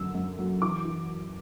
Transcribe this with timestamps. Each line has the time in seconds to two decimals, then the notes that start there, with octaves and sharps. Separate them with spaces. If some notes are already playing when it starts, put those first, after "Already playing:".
Already playing: F#2 D3 E6
0.15 F#2
0.39 F#3
0.62 E3 D6
0.85 E3